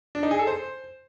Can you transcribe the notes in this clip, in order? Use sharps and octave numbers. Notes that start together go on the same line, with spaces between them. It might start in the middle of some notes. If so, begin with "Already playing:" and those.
D4
D#4
G#4
A4
C5